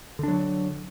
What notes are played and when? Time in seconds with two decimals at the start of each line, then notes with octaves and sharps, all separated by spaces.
0.19 D3
0.23 D4
0.28 F#3